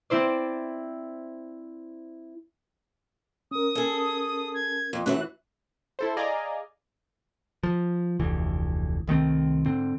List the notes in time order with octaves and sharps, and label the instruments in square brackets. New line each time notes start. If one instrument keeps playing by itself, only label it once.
[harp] C4 E4 C5 D5
[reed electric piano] C#4 A#4 [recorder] D#6
[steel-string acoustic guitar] G#4 A4
[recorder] G#6
[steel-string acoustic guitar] F2
[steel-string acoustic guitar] F#2 E3 F#3 [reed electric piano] A3 C#4 F#4 [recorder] F#6
[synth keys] E4 A4 C5
G#4 D5 D#5 F5 G#5 A#5
[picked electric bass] F3
F1 D2 E3
C2 D#3 A3 C4
G#2 D3 C4